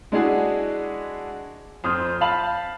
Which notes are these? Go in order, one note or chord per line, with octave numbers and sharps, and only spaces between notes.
G#3 D4 E4 F#4 G#4
F2 C4 D#6 F6 G6
F5 A5 B5 F6 F#7